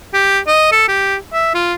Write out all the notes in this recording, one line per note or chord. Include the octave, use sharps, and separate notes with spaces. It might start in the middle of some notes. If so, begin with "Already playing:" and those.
G4
D#5
A4
G4
E5
F4